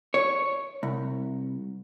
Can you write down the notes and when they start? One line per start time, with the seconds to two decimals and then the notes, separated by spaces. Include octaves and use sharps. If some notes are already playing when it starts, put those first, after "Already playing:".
0.14 C#5
0.83 C2